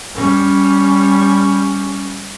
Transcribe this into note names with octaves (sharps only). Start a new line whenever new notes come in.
G3 C#4